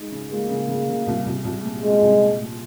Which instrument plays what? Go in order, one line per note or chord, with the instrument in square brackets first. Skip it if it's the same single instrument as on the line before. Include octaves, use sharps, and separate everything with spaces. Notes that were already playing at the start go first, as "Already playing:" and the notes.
Already playing: [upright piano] G#3 D#4
C#3
[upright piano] G#3 [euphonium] A#3
[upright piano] C#3
C#3
C#3
C2
C2
C2
A#2
[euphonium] G#3 [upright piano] C4
[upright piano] C2
A#2
A#2